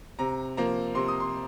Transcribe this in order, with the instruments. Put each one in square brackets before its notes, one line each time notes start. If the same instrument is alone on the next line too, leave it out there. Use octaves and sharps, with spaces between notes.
[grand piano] C3 A#5
F3 A#3 A#5
C3 C6
D#6
C6